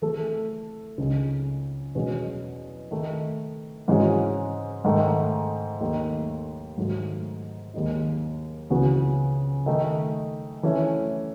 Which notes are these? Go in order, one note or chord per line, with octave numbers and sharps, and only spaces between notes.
E3 A3 E4 A4
C#2 C#3 G#3 D#4
E2 B2 G#3 C#4 F#4
D#3 A3 D#4
G#2 E3 G#3 C#4 F#4
G#2 D#3 A3
D#2 D#3 A3
G#2 D#3 F#3 A3
D#2 D#3 G#3 D#4
C#2 C#3 E3 B3 F#4
D#3 A3 D#4
E3 A3 C#4 E4